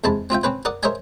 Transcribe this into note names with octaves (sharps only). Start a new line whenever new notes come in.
E2 C3 G#3 A5 B5
C4 F4 E5 G5
C4 C#4 B4 C5
A#4 D5 F#5 D#6
A#4 C5 C#5 D#5 E5 G#5